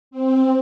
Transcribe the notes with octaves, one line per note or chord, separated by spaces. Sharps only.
C4